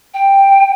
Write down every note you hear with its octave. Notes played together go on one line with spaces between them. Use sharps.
G5